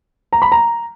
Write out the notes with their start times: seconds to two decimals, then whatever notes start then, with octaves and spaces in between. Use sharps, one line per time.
0.33 A#5
0.42 B5
0.52 A#5